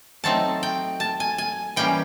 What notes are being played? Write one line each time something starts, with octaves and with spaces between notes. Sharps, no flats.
F#3 A3 C4 D#4 A5
G5
A5
G#5
G#5
E3 G3 A#3 C#4 G5